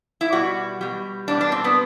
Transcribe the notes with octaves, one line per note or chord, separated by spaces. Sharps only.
E4
B2 G3 F#4
B2 G3
B2 G3 D4
D4
C4
B3